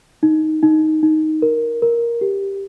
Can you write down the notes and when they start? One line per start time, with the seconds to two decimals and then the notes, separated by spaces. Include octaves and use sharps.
0.23 D#4
0.63 D#4
1.03 D#4
1.42 A#4
1.82 A#4
2.21 G4